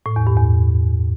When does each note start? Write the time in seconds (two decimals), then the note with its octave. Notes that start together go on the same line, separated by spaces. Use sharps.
0.06 A2
0.16 E2
0.27 G2
0.37 E2